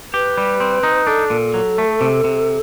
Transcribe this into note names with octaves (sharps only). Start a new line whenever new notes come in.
G4 B4
G3
C4
D#4
D4 A4
A#2
F#3
A3
C3
C3